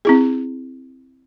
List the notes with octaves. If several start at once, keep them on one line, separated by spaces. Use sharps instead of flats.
C4 E4 G#4